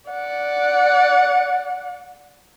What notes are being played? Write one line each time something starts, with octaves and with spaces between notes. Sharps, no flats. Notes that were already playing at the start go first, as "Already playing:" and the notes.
D5 F#5